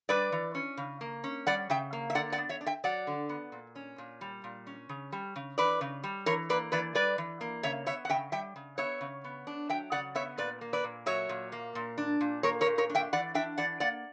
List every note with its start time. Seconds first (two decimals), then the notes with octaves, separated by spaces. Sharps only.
0.09 G3 B4 D5
0.32 E3
0.55 C#4
0.77 C#3
1.01 A#3
1.24 C#4
1.47 G3 D5 F#5
1.70 C#3 E5 G5
1.93 A#3
2.10 E5
2.15 D3 D5 F#5
2.32 D5 F#5
2.38 B3
2.49 C#5 E5
2.61 D4
2.66 E5 G5
2.84 F#3 D5 F#5
3.07 D3
3.29 B3
3.52 A#2
3.76 C#4
3.98 A#2
4.21 G3
4.44 A#2
4.67 C#4
4.89 C#3
5.12 G3
5.36 C#3
5.58 E3 B4 D5
5.81 C#3
6.04 G3
6.26 E3 A#4 C#5
6.49 A#3 B4 D5
6.72 E3 B4 D5
6.95 G3 B4 D5
7.18 E3
7.41 A#3
7.63 C#3 C#5 E5
7.86 B3 C#5 E5
8.05 F#5
8.09 C#3 E5 G5
8.32 G3 E5 G5
8.56 C#3
8.78 B3 C#5 E5
9.01 C#3
9.24 B3
9.47 D4
9.70 F#3 E5 G5
9.92 C#3 D5 F#5
10.15 B3 C#5 E5
10.38 A#2 B4 D5
10.61 A#3
10.73 B4 D5
10.84 A#2
11.06 F#3 C#5 E5
11.29 A#2
11.52 A#3
11.75 A#2
11.98 D4
12.21 A#2
12.43 A#3 A#4 C#5
12.61 A#4 C#5
12.66 A#2
12.78 A#4 C#5
12.90 D4
12.95 E5 G5
13.13 E3 D5 F#5
13.35 D4 E5 G5
13.58 E3 D5 F#5
13.80 A#3 D5 F#5